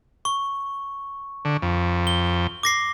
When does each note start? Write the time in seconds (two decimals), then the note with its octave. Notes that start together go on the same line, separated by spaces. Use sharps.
0.25 C#6
1.45 D3
1.62 F2
2.07 G7
2.63 D6 A#6 C7